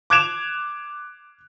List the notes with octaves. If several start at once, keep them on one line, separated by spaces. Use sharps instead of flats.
D6 F#6 G#6 D7 E7 F7